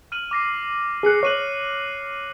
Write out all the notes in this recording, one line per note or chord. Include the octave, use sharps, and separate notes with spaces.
F6 D#7 F#7
D6 A#6 C7
G#4 F6 F#6 C7 C#7
C#5 F#6 D#7 F#7